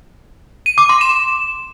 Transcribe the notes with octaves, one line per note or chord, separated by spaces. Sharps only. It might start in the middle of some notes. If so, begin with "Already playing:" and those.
D#7
D6
C6
E7